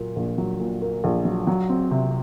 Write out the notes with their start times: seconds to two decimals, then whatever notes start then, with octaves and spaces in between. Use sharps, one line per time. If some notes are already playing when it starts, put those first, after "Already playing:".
Already playing: A#2 F#3 A#3
0.16 A#1
0.38 F#3
0.60 A#2
0.82 A#3
1.04 A#1
1.25 F#3
1.47 F#3
1.69 C4
1.91 C3